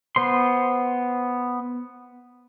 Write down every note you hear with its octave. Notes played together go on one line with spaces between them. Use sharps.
B3 C5 C6